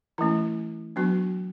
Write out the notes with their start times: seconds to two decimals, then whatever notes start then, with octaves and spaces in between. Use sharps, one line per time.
0.18 E3 A3 C#4 E4
0.96 F#3 B3 D4 F#4